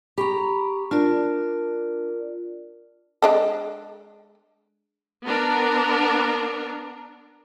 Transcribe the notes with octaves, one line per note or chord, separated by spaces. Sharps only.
G4 A#5 B5 C#6
D4 F4 A#4 D5
G#3 D4 A4
B3 D4 A#4